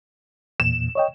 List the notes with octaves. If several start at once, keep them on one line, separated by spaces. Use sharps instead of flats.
E2 A#2 E7
C#5 D#5 G5